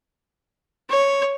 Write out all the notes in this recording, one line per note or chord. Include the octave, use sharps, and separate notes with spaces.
C#5